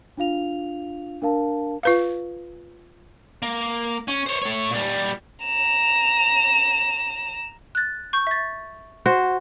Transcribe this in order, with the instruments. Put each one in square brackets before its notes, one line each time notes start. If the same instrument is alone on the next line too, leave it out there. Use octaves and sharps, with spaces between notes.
[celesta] D4 F4 F5 F7
D4 A#4 F5 A5
[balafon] F4 B4 F5
[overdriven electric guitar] A#3
C#4
C5 C#5
A3 C#5
A#2 G3
[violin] A#5 E7
[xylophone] F#6 A6
C#6 G6
E5 A6
[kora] F#4 C5